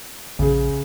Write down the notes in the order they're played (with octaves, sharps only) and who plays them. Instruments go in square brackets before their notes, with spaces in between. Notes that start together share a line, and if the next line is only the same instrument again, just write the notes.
[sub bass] A#1 [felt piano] C#3 G#4